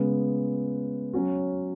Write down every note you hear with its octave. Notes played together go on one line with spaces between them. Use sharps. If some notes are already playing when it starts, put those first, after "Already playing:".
Already playing: C#3 G#3 B3
F#3 C#4 F#4